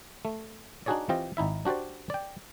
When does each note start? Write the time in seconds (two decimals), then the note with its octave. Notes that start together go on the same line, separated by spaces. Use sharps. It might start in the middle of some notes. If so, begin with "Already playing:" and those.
0.25 A3
0.86 D4 D#4 F#4 G#4 C#5 D5
1.09 E3 C4 F4 G4 D#5
1.37 G#1 D#4 E4 E5
1.65 D4 F#4 G4 C5 D5
2.10 D5 G5